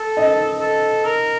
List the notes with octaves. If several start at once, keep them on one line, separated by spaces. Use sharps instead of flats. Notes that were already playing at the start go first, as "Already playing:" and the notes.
Already playing: A4
D#5
A4
A#4